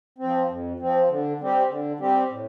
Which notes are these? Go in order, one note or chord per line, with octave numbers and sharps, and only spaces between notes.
F3 C4
F2
F3 C4
D3
G3 C4 G4
D3
G3 C4 G4
A2